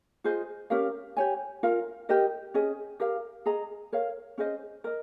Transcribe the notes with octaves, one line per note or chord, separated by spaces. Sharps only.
F4 G#4 C5 D#5
C#4 G4 A#4 F5
G4 C#5 G#5
F4 A#4 F5
G4 A#4 D#5
C#4 G#4 D#5
G4 A#4 F5
G#4 D#5 A#5
A#4 C#5 F5
C#4 G#4 C5 D#5
A#4 D#5